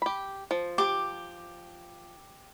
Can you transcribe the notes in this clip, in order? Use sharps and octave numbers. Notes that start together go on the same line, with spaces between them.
G4 B5
F3
G4 D6